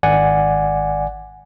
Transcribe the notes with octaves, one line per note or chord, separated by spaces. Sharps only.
G#1 D5 F#5 G#5